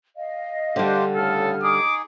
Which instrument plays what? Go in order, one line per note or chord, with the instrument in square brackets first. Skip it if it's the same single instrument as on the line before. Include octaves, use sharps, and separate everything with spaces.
[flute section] D#5 F5
[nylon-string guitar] D3 G3 [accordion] D4 G4 C5
[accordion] A2 C#3 [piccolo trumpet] A4 [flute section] F6
[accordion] D#4 G#4 [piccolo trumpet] D6